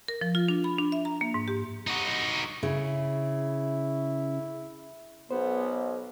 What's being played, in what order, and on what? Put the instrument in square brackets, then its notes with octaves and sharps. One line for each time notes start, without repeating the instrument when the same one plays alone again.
[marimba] A#4
F3
F4
D4
B5
D4
E5
A#5
A#3
G#2
G4
[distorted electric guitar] D#4 F#4
[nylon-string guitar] C#3 [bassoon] E4
[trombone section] B1 [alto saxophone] B3 [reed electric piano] C5